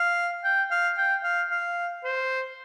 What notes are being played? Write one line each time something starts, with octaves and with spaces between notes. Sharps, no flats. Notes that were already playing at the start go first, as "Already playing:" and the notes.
Already playing: F5
G5
F5
G5
F5
F5
C5